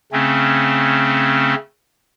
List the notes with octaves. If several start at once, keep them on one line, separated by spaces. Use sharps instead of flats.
C#3 A3 C4 C#4